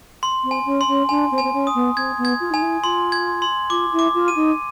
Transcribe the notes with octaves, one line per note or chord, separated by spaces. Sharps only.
C6
C4
G#5
C#4
C6
C#4
D4 G#5
C4
G#5
C4
C#4
D#6
B3
C4 G#6
B3
G#6
F4
D#4 G#5
E4
F4 C6
G#6
C6
F4 D6
E4
D6
F4
D#7
D#4